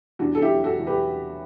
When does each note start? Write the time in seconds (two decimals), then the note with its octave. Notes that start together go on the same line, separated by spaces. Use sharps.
0.19 E2 D4 F#4
0.35 A4
0.42 E4 G4
0.50 F#3
0.64 F#4 A4
0.79 E2
0.87 G4 B4